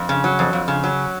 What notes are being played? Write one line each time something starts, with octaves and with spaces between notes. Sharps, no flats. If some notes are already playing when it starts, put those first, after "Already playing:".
Already playing: F2
C#3
F#3
F2
F2
C#3
F#3